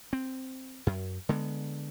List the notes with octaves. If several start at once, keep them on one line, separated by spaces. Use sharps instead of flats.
C4
F#2
D3 G#3 B3